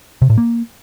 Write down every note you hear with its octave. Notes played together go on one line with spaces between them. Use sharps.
C3
A2
A#3